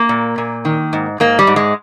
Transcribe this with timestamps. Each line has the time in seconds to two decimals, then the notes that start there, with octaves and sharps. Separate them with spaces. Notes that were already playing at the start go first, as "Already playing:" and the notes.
Already playing: A#3
0.09 A#2
0.38 A#2
0.65 D#3
0.93 G#2
1.20 G#2 A#3
1.39 G3
1.47 G#2
1.56 G#3